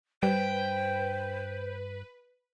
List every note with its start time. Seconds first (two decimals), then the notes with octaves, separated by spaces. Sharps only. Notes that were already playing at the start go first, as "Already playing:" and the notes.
0.23 G2 B4 C5 G5